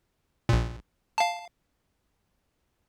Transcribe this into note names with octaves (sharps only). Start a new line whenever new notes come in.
A#1 A#2
F5 A5